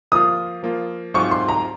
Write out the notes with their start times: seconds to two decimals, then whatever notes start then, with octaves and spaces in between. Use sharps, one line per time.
0.12 F3 A#3 F4 D#6
0.63 F3 A#3 F4
1.14 G#2 F#3 C4 F4 C5 C#6
1.31 C6
1.48 A#5